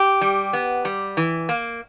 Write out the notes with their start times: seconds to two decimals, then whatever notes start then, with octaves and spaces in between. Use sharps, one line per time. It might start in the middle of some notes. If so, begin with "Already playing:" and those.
Already playing: G4
0.21 G3
0.53 B3
0.85 G3
1.17 E3
1.49 A#3